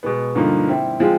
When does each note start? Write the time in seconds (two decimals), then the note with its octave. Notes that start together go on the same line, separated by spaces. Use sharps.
0.03 B2 G#3 B3
0.35 G2 D3 F3 A#3 D#4
0.68 G3 C4 E4
1.00 F3 G#3 C4 F4